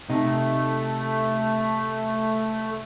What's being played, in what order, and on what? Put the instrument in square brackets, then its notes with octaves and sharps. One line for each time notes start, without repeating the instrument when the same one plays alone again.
[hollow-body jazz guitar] C3 D#4 [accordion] A3